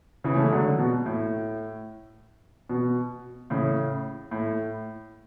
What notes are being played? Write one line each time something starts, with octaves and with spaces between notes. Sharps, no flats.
C#3 E3
A3
G#3
D3 F#3
B2
A2
B2
A2 C#3
A2